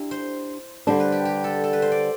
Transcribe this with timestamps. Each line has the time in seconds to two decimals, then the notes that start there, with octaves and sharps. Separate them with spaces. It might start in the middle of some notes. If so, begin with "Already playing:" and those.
Already playing: D4 E4 G4
0.11 C5
0.87 D3 G3 D4 C5
1.00 B4
1.12 G4
1.25 G4
1.44 A4
1.64 A4
1.73 B4
1.82 C5
1.92 D5